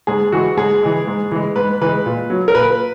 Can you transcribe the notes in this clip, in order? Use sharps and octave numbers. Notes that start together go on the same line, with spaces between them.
G#2 G#4
E3 G#3 F#4
G#2 G#4
E3 G#3
G#2
E3 G#3
G#2 B4
E3 G#3 B4
A#2
F#3
A#4
A#2 B4